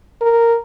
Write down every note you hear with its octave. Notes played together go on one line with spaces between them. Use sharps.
A#4